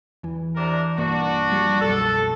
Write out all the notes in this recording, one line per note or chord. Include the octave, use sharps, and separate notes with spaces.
E2 E3
C3 D4 A#4
B1 G2 A#3 D4 F#4
F3 G3
C2 F#2 B2 A4